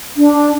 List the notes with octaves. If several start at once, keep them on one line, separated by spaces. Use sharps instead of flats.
D4